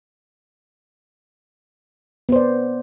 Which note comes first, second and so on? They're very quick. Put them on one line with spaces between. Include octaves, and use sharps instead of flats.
B3 C5 D5